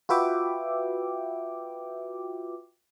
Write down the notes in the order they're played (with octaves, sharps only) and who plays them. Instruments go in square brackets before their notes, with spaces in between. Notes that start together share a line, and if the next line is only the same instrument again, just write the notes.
[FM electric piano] F4 F#4 B4 E5 G5 D6